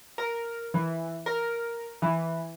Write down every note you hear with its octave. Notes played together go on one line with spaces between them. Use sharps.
A#4
E3
A#4
E3